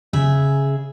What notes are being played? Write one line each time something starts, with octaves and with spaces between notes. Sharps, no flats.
C#3 G#4 E5